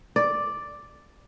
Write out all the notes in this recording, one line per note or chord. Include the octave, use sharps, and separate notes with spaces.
D5